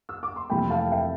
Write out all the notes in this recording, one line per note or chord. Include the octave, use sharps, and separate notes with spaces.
E6
D6
C6
F1 F2 C3 E3 A3 G5 B5
F5 A5
E5 G5